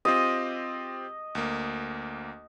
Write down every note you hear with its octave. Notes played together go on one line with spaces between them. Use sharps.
C4 F4 G4 D#5
D2 A#3